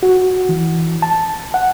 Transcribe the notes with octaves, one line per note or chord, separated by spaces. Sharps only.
F#4
E3
A5
F#5